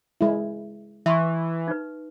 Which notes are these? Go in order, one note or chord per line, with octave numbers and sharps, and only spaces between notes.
G#3 E4
E3 E5 C6 C#6
D#4 B4